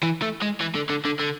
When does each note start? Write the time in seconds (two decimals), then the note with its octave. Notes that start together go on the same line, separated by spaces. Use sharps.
0.03 E3
0.22 A3
0.42 G#3
0.61 E3
0.75 D3
0.90 D3
1.05 D3
1.20 D3